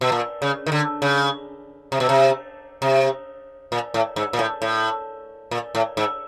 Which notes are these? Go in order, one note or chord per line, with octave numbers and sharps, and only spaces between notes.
B2
A#2
C#3
D#3
D3
C#3
C3
B2
C3
C3
A#2
A2
G#2
A#2
A2
A2
A#2
A2
G#2